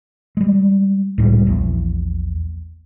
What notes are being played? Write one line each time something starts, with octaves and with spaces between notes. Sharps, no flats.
G3 G#3
C#2 A2 G3
A#1 E2